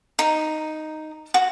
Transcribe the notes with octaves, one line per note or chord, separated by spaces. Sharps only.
D#4
F#4